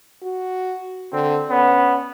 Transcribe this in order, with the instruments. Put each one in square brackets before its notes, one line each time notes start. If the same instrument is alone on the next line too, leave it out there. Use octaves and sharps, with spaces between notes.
[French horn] F#4
[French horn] D3 [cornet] C4
[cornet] B3 [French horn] C#4